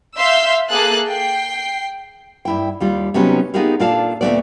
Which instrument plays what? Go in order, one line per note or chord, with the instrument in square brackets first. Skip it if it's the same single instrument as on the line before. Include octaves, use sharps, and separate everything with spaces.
[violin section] E5 F5 C6 E6 G6
A#3 G#4 A4 F#6 A6
G5 C7
[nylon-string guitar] G2 E4 G5
D#2 G3 F4
C3 F#3 B3 C#4 D#4 G4
B3 D#4 F4 G4 G#4 A#4
A#2 D4 F4 A4 F5 A5
D2 A#2 D#3 A3 B3 D5